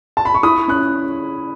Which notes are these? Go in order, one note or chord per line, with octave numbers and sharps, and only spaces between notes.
A5
B5
C#6
E4 B5 D#6
C#4 F#6